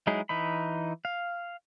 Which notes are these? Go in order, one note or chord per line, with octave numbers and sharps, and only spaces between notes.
F#3 G#3 D#4 E4 G#4
E3 D#4 B5
F5